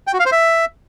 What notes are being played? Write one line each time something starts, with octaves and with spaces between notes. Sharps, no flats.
G5
F#4
F5
C5
E5